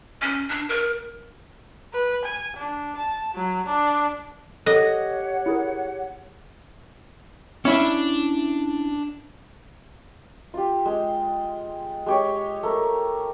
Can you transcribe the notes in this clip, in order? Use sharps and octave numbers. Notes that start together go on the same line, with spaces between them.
C#4
D4
A#4
B4
G#5
D4
A5
F#3
D4
G4 A4 C#5 D#5 F#5
E4 G#4 A#4
C#4 D4 E4 E5
F4 G4
G#3 G5
G#3 G4 C#5
A3 A#4